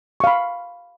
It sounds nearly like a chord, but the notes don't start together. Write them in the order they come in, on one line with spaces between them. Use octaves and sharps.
C#6 F5 B5